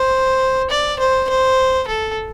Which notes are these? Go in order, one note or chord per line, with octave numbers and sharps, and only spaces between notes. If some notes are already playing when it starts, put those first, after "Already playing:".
Already playing: C5
D5
C5
C5
A4